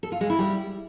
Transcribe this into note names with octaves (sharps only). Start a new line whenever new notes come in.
A4
F4
G#3
E4
G3